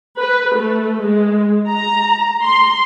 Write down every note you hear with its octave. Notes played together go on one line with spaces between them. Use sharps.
B4
A3
G#3
A#5
C6